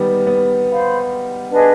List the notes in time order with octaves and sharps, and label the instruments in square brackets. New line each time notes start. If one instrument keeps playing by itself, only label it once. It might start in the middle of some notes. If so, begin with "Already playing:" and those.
Already playing: [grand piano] D#3 G3 B3
B3
[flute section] C5 F5 B5
D4 G#4 B4 D#5